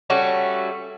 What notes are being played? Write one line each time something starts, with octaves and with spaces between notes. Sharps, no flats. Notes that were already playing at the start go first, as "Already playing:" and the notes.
G3 A3 C#4 F#4